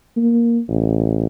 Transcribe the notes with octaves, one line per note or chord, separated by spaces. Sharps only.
A#3
A1